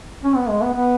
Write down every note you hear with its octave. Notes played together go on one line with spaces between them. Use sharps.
C#4
B3
G#3
B3
B3